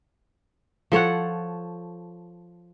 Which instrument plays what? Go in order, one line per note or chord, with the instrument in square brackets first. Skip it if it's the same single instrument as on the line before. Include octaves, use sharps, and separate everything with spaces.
[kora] F3 A4 C#5 F#5